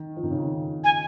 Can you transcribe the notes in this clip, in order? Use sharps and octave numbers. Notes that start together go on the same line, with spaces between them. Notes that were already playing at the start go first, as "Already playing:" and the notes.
Already playing: D#3
F3
D#3
C#3
D#3
G#5